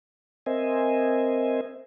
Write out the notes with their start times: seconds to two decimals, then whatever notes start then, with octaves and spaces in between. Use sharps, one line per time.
0.46 C4 A#4 C5 D#5 E5 G#5